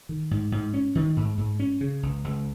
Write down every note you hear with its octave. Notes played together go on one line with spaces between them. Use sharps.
D#3
G#2
G#2
C#4
D#3
G#2
G#2
C#4
C#3
C#2
C#2